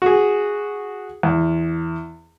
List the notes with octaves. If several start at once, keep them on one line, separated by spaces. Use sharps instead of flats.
F#4 G#4
E2